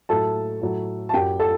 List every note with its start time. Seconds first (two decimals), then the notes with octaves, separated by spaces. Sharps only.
0.09 A2 F#3 A4 A5
0.61 A2 F#3
1.09 A5
1.14 F#2 F#3 G4 G5
1.40 A4 A5